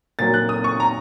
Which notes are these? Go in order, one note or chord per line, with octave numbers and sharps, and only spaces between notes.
A#2 F#3 A6
F#6
D#6
C#6
A#5